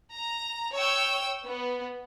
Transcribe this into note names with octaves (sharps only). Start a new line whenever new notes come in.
A#5
C#5 G5 E6
B3